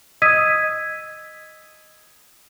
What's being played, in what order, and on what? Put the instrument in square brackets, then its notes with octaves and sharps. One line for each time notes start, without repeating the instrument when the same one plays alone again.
[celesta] D#5 D#6 E6 G#6 B6 D#7